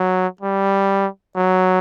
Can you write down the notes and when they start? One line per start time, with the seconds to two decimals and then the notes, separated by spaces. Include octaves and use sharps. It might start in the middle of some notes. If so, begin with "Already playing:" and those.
Already playing: F#3
0.41 G3
1.36 F#3